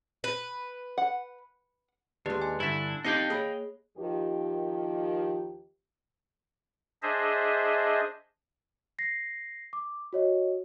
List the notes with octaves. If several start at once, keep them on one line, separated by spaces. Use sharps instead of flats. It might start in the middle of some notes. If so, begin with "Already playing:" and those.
B4
F#5
D#2 G#3 D4 G4 B4 D5
G#5 C6
G2 D3 E4 E5
C4 D#4 G4 D#5 F5 G5 G#6 C#7
A#3 G#4 C#5 B5
D#2 D#3 F3 G4
D4 G#4 C5 D#5 E5
A#6 C7
D6
F#4 C#5 D#5